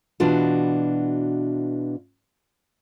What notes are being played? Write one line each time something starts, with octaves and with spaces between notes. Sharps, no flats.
B2 E3 D4 F4 F#4